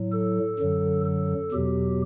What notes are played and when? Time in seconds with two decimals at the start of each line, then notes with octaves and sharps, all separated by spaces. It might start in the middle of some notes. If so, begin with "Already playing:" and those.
Already playing: A2 F#3
0.12 A4
0.59 F#2 D3 F#3
1.05 A4
1.52 E2 B2 F#3 G4